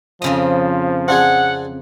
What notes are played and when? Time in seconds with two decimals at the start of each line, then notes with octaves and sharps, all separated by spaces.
0.22 F2 C#3 F3 D#5
1.08 C4 D4 G#4 F#5